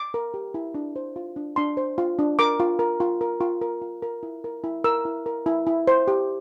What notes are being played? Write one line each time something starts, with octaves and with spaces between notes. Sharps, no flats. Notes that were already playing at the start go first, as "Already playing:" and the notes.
Already playing: D6
A#4
G4
E4
D4
C5
F4
D4
D4 C6
C5
F4
D4
A#4 D6
F4
A#4
F4
A#4
F4
A#4
F4
A#4
E4
A#4
E4
A#4 E6
E4
A#4
E4
E4
C5
G4